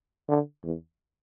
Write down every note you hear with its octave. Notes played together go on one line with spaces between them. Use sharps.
D3
E2